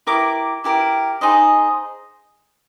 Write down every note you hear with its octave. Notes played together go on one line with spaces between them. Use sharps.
E4 G4 A#4 D6
E4 G4 A#4
D#4 G#4 C5 D#5